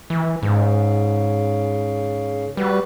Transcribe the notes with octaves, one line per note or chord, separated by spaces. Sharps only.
E3
G#2 C#3
G3 F#4 B4